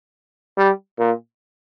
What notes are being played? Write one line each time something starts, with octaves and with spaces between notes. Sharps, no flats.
G3
A#2